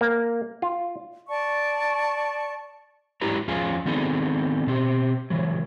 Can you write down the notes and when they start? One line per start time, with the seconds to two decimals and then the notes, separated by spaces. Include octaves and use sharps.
0.01 A#3
0.62 F4
1.29 D5 A5 C#6
3.21 G#2 F#3 E4 G4 B4 A#5
3.48 F2 C#4 F4 G#4 F5 G#5
3.85 D#3 B3 C4 D#4 G#4 A4
4.67 B2 C4 G4
5.30 C#3 E3 F#3